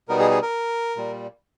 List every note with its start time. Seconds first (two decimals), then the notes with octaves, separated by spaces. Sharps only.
0.09 B2 G3 B3 D#4 A#4
0.19 G#4
0.31 G#4
0.42 A#4
0.96 A#2 G3